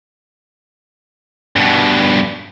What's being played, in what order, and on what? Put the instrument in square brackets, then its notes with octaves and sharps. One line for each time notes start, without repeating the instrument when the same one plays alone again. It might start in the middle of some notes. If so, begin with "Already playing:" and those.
[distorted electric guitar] G2 B2